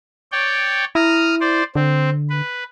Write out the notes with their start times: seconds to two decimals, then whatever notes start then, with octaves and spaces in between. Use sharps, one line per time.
0.32 C#5 D5 G5
0.95 E4 A#5 D#6 F6
1.41 C5 D5
1.75 D3 C4
2.30 B4